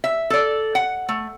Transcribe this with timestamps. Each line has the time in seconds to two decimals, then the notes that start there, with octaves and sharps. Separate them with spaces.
0.04 E5
0.30 A4 D5
0.75 F#5
1.09 A3